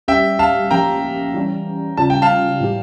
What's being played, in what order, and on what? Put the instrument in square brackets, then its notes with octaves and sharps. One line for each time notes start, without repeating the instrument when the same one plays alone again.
[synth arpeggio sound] G3 C#4 G4 [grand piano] E5 G5
[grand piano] F5 A5
[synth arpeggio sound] F3 A#3 C#4 G4 [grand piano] G5 A#5
[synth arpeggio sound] E3 G3 C#4
[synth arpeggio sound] C#3 G3 C#4 F4 [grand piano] A5
[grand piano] G5
F5 A5
[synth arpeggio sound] A2 E3 G3